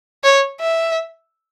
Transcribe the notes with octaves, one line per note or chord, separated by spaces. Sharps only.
C#5
E5